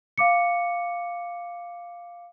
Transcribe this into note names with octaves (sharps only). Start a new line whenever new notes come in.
F5 D6 C#7